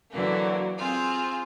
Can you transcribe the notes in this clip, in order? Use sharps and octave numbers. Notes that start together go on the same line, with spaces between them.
D3 E3 F#3 A#3
C4 F4 G#4